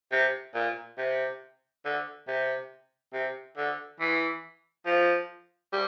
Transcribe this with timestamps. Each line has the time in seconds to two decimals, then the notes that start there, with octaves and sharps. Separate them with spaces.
0.12 C3
0.55 A#2
0.98 C3
1.85 D3
2.28 C3
3.13 C3
3.57 D3
4.00 E3
4.86 F3
5.73 G3